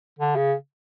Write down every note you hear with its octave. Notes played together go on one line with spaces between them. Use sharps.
D3
C#3